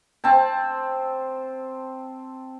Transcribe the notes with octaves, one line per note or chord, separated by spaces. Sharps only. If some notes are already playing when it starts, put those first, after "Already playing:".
C4 A5